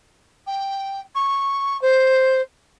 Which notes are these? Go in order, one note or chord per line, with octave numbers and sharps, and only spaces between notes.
G5
C#6
C5